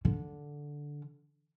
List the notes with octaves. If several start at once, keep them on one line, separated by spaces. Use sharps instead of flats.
D3